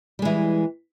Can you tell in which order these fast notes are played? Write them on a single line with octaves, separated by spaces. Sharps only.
G3 G#3 E3